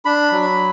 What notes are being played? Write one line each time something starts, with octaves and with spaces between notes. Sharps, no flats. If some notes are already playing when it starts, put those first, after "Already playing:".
D4 B5
F#3